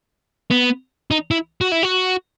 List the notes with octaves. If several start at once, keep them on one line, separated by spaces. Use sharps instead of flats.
B3
D#4
E4
F#4
E4
F#4